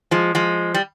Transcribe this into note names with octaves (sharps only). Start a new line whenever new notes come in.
F3 G#3
F3 G#3
G3